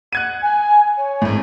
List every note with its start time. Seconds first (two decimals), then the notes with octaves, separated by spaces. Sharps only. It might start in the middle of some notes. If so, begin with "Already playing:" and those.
0.13 F#5 F#6 G#6 D#7
0.41 G#5
0.97 C#5
1.22 G#1 A2